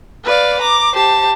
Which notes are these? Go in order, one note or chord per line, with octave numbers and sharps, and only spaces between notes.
B4 D5 F5
A#5 D6
G4 C5 A5